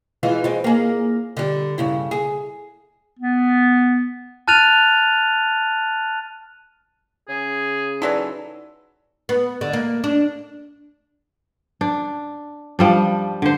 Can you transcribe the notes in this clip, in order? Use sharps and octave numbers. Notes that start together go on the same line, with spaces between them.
E3 G#3 F4
G#3 C4
A#3 G#4
D3 G3
G2 C#3 E4
G#4
B3
A5 F6 F#6 A6 D#7 F7
C#3 G#4
E3 F#3 D#4 A4 D5
B3
D3
A#3
D4
D4
F3 G3 D4
D3 C5